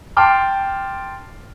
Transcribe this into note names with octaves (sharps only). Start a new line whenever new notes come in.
G5 A5 C6 D6 F6